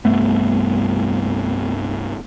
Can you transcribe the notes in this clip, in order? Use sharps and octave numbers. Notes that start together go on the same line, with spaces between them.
C2 G2 A3 B3